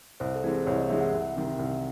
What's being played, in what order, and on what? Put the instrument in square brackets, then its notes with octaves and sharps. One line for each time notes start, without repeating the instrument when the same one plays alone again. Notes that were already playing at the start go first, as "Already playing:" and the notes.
[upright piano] C2 [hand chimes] C5
[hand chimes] A4
[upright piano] C3 E3 G#3
[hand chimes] C5
[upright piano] C2 [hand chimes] C#5
[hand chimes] D#5
[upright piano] C3 E3 G#3 [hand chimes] E5
[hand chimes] F#5
[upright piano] C2 [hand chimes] E5
[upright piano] C3 D#3
C2